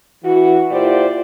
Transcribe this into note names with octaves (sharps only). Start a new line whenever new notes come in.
E3 F#4
A#2 E4 F4 G4 C5 D5